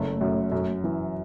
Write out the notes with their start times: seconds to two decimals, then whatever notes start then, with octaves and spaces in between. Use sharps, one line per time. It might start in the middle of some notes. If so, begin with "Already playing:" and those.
Already playing: F#1 A3
0.21 F#2
0.52 F#2
0.84 E3